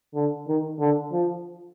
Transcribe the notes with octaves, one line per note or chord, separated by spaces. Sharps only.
D3
D#3
D3
F3